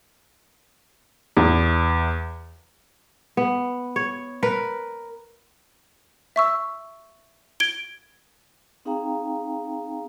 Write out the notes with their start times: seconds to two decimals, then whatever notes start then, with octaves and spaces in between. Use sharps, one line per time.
1.37 E2
3.37 B3
3.96 C#5
4.43 A#4 B4
6.36 E5 C#6 E6
7.60 G#6 D7 G7
8.85 C4 D#4 G#4 F5 G5 A#5